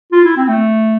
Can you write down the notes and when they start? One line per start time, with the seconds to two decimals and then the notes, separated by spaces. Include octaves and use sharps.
0.12 F4
0.24 E4
0.36 C4
0.48 A3